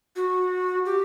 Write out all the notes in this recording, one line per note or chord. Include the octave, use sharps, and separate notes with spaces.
F#4
G4